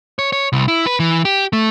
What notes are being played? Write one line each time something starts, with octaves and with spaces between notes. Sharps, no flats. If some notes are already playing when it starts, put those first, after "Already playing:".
C#5
C#5
C2
E4
B4
E3
G4
A3